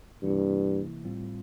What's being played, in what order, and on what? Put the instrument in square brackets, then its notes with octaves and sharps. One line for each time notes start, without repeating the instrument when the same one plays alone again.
[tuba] G2 [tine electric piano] C3 E3 A#3 E4
[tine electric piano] A2 G3 C4 F4